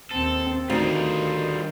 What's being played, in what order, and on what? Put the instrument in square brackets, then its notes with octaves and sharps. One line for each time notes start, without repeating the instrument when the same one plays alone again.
[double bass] D#2 C4 [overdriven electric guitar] A4
[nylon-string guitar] D2 D#4 [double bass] D#3 [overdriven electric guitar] G3 F4